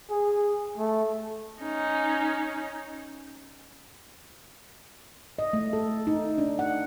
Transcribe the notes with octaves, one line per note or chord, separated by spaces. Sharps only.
G#4
A3
C#4 D#4
D#5
A3
A4
D#4
D4
F#5